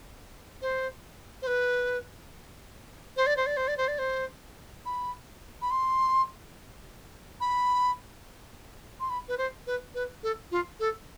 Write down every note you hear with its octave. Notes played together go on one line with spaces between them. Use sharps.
C5
C5
B4
C5
D5
C5
D5
C5
D5
C5
D5
C5
B5
B5
C6
B5
C6
B5
B4
C5
B4
B4
A4
F4
A4